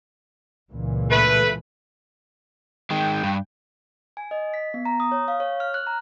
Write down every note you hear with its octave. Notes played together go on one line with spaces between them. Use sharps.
C#2 A#2 E3
A3 B4
D#3 G#3 G5
G2
G#5
D#5
B6
B3
A#5
D#6
C#5
F5
C#5
F6
F#6
A#5